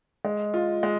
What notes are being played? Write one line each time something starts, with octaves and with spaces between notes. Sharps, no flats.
G#3
F4
G#3